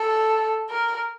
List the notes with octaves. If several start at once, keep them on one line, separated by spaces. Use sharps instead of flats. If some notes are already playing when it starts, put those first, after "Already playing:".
Already playing: A4
A#4